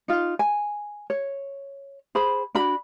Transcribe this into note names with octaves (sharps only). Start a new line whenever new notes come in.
D#4 F4
G#5
C#5
G#4 C5 B5
D4 F#4 B5